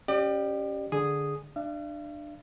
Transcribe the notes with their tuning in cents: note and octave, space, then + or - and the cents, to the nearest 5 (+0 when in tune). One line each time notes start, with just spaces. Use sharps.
C#4 +0 G4 +0 D5 +40
D3 +0 G#4 +0 D#6 +0
D4 +25 F5 -45